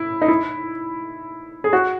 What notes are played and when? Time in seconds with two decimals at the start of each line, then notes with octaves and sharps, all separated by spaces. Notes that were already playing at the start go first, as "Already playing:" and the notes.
Already playing: E4
0.22 D#4
0.28 E4
1.64 G#4
1.73 F#4